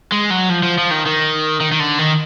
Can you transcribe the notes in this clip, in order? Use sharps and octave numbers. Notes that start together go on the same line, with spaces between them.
G#3
F#3
F3
F3
F3
D#3
D#3
D#3
D#3
D3
D#3